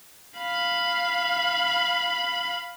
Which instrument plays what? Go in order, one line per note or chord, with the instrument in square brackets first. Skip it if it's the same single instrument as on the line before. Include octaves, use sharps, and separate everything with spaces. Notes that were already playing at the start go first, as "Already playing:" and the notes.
[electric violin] F5 B5